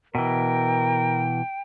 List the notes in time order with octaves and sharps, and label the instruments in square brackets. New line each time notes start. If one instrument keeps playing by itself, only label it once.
[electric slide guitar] B2 E3 [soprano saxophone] A#4 [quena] G5